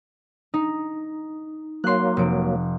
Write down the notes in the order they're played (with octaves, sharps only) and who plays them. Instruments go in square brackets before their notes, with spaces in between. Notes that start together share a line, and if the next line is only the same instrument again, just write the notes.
[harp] D#4
[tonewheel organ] F#3 A#3 [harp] C6 F#6
[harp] F1 D7